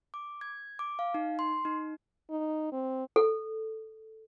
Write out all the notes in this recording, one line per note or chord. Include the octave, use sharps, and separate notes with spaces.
D6
G#6
D6
F5
D#4
C6
D#4
D#4
C4
A4